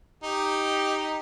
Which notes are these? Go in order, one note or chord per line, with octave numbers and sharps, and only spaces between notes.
D#4 G4